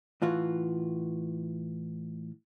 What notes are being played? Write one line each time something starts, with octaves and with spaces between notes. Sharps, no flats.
A2 E3 F4 F#4